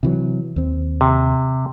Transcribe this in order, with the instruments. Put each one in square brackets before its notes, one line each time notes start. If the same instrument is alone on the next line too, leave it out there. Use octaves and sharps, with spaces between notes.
[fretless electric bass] C3 E3 F#3
D#2 C4
[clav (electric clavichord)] C3